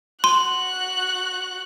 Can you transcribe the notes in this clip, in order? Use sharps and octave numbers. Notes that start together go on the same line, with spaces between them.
F#4 C6 F#6